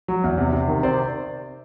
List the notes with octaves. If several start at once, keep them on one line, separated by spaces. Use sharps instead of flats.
F#3
E2
C3
C3
D#3
C3 C5 D5